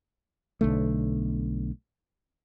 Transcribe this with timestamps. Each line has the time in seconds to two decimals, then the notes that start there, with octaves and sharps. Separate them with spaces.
0.61 B1 D3 A3